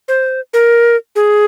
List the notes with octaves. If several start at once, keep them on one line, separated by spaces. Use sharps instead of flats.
C5
A#4
G#4